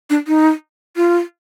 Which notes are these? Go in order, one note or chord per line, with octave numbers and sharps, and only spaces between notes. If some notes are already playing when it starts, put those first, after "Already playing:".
D4
D#4
F4